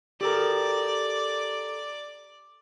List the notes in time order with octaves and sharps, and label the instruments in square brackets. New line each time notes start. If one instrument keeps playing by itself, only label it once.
[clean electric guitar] G4 A4 A#4 [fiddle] D5